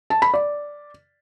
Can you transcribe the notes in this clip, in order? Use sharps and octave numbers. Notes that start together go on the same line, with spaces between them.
A5
B5
D5